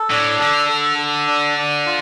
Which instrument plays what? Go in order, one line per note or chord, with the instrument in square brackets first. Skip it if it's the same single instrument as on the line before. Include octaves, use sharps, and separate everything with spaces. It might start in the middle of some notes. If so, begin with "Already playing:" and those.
Already playing: [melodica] A4
[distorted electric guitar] A2 [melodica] D4
[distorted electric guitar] D3 [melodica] A4
[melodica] A4
A4
D4
D4
F4